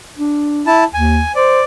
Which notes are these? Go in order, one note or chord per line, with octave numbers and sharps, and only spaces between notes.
D4
E4 A5
D#2 G#5
C5 D5